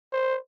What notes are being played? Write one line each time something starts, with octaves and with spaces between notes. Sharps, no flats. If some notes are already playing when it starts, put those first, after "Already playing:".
C5